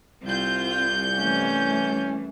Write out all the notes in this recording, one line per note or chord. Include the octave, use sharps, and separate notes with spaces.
C2 C4 F4 G6
E3 A3 C#4